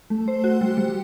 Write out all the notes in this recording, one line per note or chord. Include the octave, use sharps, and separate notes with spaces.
A3
C5
F#4
G3
G3